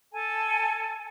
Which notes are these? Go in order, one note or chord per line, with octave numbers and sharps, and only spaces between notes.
A4 G#5 A5